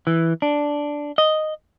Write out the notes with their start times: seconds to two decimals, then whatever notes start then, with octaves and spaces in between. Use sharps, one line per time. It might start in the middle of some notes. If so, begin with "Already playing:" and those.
0.07 E3
0.42 D4
1.18 D#5